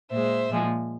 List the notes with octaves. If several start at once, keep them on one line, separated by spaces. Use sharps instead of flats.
A#2 G#3 C5 E5
A#2 F3 G#3